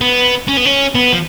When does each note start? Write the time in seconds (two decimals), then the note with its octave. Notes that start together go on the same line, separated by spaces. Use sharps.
0.01 B3
0.48 C#4
0.57 B3
0.65 C#4
0.95 B3
1.12 F3